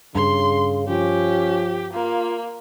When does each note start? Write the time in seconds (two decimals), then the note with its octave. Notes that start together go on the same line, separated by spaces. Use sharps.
0.15 G2 C#3 C6
0.88 F3 C#4 G4
1.94 A#3 F4